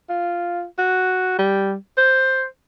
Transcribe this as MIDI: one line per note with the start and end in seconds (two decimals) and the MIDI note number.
0.09 0.64 65
0.79 1.35 66
1.39 1.74 55
1.98 2.46 72